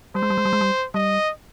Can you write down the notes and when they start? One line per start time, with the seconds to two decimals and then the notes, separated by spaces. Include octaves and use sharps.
0.15 G3 C5
0.23 G#3
0.30 G3
0.38 G#3
0.45 G3
0.53 G#3
0.61 G3
0.94 G3 D#5